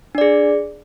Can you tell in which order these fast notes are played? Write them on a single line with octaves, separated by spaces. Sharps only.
D4 D5 G#4